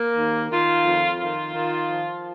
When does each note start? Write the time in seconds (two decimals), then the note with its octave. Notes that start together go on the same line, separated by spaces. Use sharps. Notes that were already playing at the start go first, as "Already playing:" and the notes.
Already playing: A#3
0.17 D#2
0.51 D#3 F4
0.85 F2
1.19 D#3 F4
1.53 D#3
1.88 F3